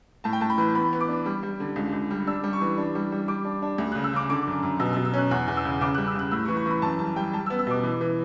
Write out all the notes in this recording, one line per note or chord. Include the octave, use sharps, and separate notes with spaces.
A2 A5
G5
A2 A5
B5
E3
B3 B5
B3
D6
D4
G3
G3
D3
C#2
C#2
G3
D4 E6
G3
C#6
E3
D4
G3
G3
G3 D6
D4
D4
D2
C#3 F#6
E6
C#3 D6
D3 D6
F#2
F#2
B2 E6
E6
B2
E6
C#4 F#6
E2 F#6
E2
E6
C#3
C#3 D6
G3 F#6
E6
C#3 F#6
A2 E6
C#6
E3
C#6
E3 B5
F#2 A5
G3 A5
G3 G5
G3 A5
E6
B3
E6
B2 D6
E3
E3